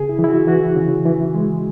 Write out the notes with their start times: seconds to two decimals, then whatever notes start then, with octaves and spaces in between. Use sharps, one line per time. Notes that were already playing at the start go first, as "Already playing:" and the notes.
Already playing: C#3 G#4
0.09 E4
0.19 E3
0.24 E4
0.29 F#4
0.47 E3 F#4
0.76 C#3
1.05 E3
1.34 G#3